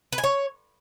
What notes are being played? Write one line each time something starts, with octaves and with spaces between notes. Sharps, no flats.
B4
G#5
C#5